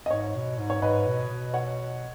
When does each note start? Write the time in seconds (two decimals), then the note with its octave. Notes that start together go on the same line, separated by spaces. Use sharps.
0.06 D#5
0.10 G#2 C#5
0.35 B2
0.58 G#2
0.70 C#5
0.82 G#2 B4 D#5
1.06 B2
1.30 B2
1.54 C#5 F#5